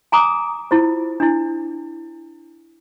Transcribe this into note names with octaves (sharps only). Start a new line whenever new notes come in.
G#5 A#5 D6 D#6
E4 F4 C5
D4 E4